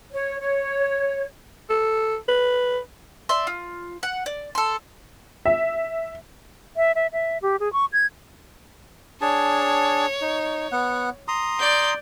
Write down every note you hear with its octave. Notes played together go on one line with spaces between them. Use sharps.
C#5
C#5
A4
B4
D5 E5 C6
F4
F#5
D5
A4 C6
E5
E5
E5
E5
G4
G#4
C#6
G#6
D4 G#4 C#5 A5
D#4
B3 F#5
A#5 C6 D#6
D5 G6